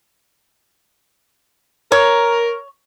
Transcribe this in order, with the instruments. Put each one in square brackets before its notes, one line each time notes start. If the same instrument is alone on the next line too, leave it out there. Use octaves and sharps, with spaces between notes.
[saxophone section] A#4 [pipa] C#5